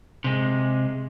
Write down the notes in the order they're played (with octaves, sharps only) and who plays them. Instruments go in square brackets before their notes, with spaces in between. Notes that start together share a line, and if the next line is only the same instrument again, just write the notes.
[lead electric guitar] C3 G#3